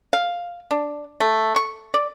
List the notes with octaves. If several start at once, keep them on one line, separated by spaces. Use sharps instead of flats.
F5
D4
A3
C#6
D5